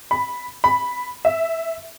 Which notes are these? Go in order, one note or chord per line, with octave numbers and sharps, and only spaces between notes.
B5
B5
E5